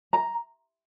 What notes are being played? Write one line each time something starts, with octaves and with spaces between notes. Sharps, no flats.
A#5